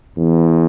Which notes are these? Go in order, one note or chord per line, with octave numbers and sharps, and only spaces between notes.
E2